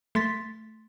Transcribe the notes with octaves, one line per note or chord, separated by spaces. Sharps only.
A3 C6 A6 B6